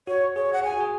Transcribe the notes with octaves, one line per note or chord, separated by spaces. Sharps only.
F#4 C#5
G#4 C#5
F#5
G#4 G#5
F#4
G#4